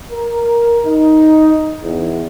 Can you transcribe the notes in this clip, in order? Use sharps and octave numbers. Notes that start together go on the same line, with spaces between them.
A#4
D#4
E2